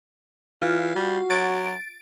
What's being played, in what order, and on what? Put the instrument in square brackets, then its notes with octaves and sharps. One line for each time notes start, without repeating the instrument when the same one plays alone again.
[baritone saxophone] E3 [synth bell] F4
[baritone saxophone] G3 [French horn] F#4
[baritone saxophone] F#3 [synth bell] A6 D7